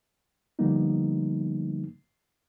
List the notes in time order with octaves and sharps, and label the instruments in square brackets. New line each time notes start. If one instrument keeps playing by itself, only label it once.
[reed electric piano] D3 F3 G3 A#3 B3 D#4